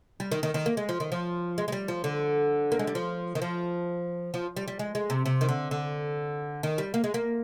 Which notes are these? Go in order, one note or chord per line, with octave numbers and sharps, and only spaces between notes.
G3
D#3
D#3
D#3
A#3
G#3
F3
D#3
F3
G#3
G#3
G3
F3
D3
A#3
G#3
G3
F3
D#3
F3
F3
G3
G3
G#3
G#3
C3
C3
D#3
D3
D3
D#3
G3
A#3
G#3
A#3